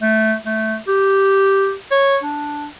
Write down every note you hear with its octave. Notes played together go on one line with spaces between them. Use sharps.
A3
A3
G4
C#5
D4